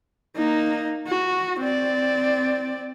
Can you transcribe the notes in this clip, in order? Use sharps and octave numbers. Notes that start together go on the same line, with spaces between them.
A#3 D#4
F#4
C4 D5